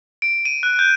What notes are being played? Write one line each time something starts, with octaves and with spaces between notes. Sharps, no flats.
D7
D#7
F#6
G6